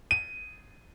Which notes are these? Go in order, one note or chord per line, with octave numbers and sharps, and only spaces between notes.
D#7